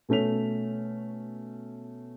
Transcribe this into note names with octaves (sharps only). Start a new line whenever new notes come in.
B2 A3 C#4 B6 F7